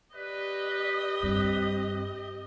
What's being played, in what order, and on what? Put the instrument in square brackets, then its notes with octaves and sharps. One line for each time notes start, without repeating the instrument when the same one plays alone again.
[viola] G4 D#5 [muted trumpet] B4 [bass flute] D5
[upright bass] G2 [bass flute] C4